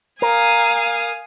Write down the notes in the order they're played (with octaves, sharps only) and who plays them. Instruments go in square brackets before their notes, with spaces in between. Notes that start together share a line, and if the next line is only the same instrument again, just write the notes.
[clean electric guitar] A#4 [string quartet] F5 G#5 D#6